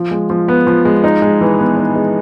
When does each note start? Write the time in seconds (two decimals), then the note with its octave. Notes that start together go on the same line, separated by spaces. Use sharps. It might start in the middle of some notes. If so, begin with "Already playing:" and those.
Already playing: F3
0.11 G#3
0.30 F3
0.48 B3
0.67 F3
0.85 G#3
1.04 D#4
1.22 G#3
1.41 E3
1.59 B3
1.77 D#4
1.96 G#3